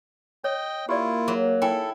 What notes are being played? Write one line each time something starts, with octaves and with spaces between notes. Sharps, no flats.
C#5 D#5 G5
A#3 E4 F4 G4 D5
F#3 G#4
E4 A4 G5 G#5